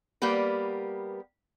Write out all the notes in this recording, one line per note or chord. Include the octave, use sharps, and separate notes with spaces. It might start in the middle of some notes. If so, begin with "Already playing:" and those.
G3 A#3 B3 G4 B4